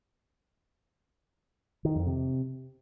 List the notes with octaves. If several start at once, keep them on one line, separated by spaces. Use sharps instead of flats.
D#3
F2
C3